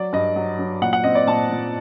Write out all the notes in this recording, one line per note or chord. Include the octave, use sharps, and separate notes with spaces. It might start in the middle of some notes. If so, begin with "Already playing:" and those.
Already playing: F#3 D5
G2 D#5
F#3
F#3
A#2 F#5
F#5
C4 D#5
D5
A#2 A5
A#2